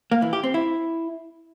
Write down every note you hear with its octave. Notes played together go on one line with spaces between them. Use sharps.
A#3
E3
G4
C4
E4